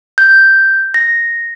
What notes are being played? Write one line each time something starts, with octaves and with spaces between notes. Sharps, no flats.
G6
A#6